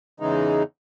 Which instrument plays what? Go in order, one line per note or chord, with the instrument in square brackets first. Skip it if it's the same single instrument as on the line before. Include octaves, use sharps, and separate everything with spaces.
[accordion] E2 C#3 E3 G#3 D#4